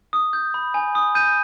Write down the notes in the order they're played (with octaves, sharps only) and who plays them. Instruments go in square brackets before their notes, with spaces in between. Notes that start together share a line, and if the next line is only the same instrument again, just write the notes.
[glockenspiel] D#6
G6
B5
G#5
D#6
G6 D#7